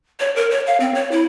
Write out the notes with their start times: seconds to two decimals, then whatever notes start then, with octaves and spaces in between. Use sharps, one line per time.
0.20 C#5
0.36 A#4
0.51 C#5
0.67 F5
0.80 C4
0.95 C#5
1.12 E4